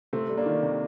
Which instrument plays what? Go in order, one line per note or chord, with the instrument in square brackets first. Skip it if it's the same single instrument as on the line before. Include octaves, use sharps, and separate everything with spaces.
[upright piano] C3 A3 C4
G3
A#3 D4
D#3
C3